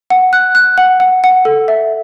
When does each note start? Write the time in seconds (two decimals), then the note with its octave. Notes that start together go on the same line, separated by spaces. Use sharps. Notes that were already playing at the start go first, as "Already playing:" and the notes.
0.10 F#5
0.33 F#6
0.55 F#6
0.78 F#5
1.00 F#5
1.24 F#5
1.45 A4
1.68 E5